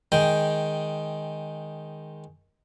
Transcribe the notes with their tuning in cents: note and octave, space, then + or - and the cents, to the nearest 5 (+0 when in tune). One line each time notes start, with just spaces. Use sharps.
D#3 +0 G#3 +0 G5 +0